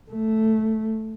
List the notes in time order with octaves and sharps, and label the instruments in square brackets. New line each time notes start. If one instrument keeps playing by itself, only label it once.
[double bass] A3